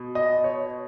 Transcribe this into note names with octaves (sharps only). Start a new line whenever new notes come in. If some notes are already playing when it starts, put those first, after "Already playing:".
Already playing: B2
D#5
C#5